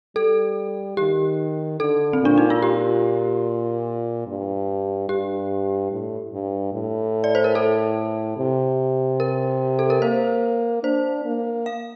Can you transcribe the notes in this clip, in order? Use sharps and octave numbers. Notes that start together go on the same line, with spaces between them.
G3 A4
D#3 G4
D3 A4
C4
A#2 D4
D#4
F4
G4
G2
G2 G4
A2
G2
A2
D5
C5
A#4
A4
C3
A#4
A4
A#4
A#3 C5
D4 C5
A#3
F5